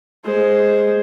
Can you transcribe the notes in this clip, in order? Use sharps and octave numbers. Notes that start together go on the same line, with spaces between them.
G#3 C5